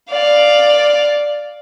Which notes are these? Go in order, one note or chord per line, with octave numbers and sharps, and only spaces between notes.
D5 F5